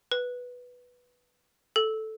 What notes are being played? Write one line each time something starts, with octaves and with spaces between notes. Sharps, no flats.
B4
A4